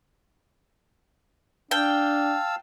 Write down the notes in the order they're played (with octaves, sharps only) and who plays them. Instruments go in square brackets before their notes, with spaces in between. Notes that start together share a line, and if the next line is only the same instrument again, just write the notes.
[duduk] D4 [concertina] F5 A5 E6 [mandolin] G5